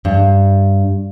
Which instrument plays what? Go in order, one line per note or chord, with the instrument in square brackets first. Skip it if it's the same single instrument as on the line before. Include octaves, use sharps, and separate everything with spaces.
[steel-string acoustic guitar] G2